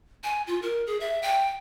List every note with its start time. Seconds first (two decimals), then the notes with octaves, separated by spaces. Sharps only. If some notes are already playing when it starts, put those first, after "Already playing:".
0.23 G#5
0.47 F4
0.62 A#4
0.87 G#4
1.00 E5
1.23 G5